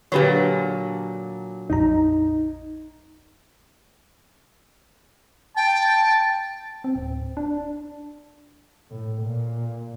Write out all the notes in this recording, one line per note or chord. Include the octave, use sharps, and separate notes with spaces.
A#2 D3 F#3 G4 B4 C#5
A#1 F2 D#4 A#5
G5 A5
C4
D1
D4
A2
A#2